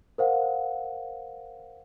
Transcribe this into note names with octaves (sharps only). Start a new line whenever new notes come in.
A#4 C5 F5 F#5